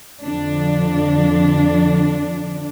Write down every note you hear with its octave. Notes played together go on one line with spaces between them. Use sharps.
F2 D3 F3 D4